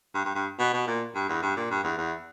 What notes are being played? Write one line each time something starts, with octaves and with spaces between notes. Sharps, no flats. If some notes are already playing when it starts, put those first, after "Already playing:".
G2
G2
G2
B2
B2
A#2
G2
E2
G2
A#2
G2
E2
E2